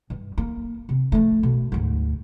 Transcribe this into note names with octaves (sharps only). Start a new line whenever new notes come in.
G2
A#3
C3
F3 A3
B2
D2 G#2